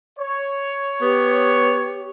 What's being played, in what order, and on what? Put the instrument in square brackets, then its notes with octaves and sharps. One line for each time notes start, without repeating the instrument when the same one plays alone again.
[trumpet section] C#5
[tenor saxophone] B3 [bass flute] G4